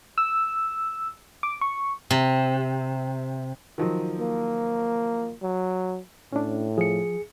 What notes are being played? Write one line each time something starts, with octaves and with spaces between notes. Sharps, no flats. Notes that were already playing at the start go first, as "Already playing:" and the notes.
E6
D6
C#6
C3
D#3 F3 F#3
A#3
F#3
A2 C#4 D4
F3 G#4 C#7